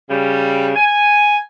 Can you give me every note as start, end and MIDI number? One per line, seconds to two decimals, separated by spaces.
0.10 0.72 49
0.10 0.72 55
0.76 1.37 80